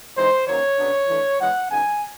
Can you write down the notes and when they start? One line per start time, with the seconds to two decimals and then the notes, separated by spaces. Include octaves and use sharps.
0.16 E3 G#3 C4 D#4 C5
0.47 D#3 F#3 A#3 C#4 C#5
0.78 C#3 F#3 B3 D4
1.08 E3 A3 D4
1.40 E3 G#3 B3 F#5
1.70 C#3 F#3 B3 D#4 G#5